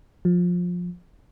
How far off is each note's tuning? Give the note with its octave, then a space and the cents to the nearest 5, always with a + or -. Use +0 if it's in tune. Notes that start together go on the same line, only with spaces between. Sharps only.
F3 +20